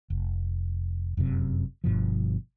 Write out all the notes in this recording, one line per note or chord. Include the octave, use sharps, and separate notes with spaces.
F1
F1 F#2 C3
G1 G2 B2 F3